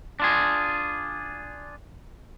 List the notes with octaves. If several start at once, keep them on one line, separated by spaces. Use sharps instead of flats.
D4 F4 G#4